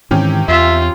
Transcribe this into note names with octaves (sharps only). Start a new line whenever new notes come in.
G#2 C3 D#3 E3 C#4 G4
E2 F4 E5